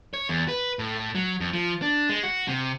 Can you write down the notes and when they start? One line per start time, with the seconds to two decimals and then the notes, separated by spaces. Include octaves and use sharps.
0.14 C#5
0.29 E2
0.48 B4
0.79 A2
1.15 F#3
1.40 F2
1.54 F3
1.82 D4
2.09 G#3
2.23 F#4
2.48 C3